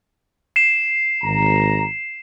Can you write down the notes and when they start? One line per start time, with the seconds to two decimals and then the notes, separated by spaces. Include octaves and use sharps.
0.56 C7 E7
1.22 G#1 A#5